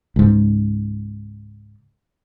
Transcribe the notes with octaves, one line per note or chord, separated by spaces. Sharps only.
C#2 G#2